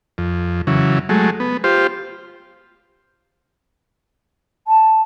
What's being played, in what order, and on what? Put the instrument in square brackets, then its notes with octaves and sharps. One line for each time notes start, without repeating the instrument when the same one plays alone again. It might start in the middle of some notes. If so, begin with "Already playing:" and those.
[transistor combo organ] F2
C#3 E3 F#3
F#3 G#3 A3
B3
F4 G4 C5
[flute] A5